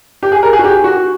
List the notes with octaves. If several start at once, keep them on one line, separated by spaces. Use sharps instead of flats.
G4
G#4
A#4
G#4
F#4
G4
F#4